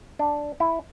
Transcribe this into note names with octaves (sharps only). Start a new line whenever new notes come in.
D4
E4